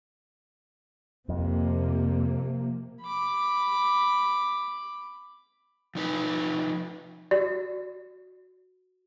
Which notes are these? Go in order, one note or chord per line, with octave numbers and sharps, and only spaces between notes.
F2 C3 F3 A#3
B5 D6
F3 D#4 B4
F#4 D5